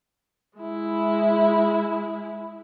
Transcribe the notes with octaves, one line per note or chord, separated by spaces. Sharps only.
G#3 E4